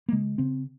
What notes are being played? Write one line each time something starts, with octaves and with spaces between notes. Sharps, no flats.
A#3
C#3 G#3
C#3 C4